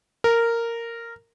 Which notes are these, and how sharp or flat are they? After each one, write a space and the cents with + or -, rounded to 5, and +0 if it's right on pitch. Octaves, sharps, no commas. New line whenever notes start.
A#4 -10